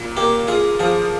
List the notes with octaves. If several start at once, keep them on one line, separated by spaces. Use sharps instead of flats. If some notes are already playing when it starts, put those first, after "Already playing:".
Already playing: A#2
A#3 G4
F4 G#4
F3 G#4